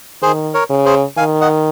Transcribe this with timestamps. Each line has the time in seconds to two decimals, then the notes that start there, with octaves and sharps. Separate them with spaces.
0.22 D#3 G#4 C5
0.54 A#4 C#5
0.70 C#3
0.85 G#4 C5
1.17 D#3 F5 G#5
1.41 D#5 F#5